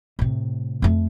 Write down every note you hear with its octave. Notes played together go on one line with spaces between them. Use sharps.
A2 C3
F2 A3